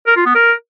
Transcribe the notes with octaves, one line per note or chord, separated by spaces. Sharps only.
A#4
F4
B3
A#4